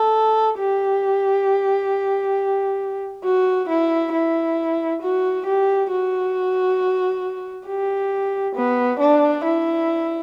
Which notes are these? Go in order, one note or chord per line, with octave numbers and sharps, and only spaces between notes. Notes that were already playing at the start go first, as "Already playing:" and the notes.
Already playing: A4
G4
F#4
E4
E4
F#4
G4
F#4
G4
B3
D4
E4